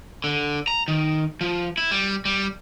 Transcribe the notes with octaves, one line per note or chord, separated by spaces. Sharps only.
D3
A#5
D#3
F3
E4
G3
G3